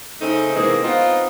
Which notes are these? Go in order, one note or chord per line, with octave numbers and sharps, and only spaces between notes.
C#3 A3 C4 D#4
C3 E3 G#3 A#3 C4
B3 C4 D#4 F4